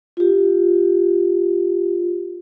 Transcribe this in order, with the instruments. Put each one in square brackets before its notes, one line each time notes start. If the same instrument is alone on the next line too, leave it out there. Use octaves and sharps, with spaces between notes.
[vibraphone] F4 G4